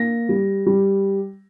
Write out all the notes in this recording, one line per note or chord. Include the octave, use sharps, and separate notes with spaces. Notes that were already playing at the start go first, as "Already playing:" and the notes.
Already playing: A#3 A#6
G3
G3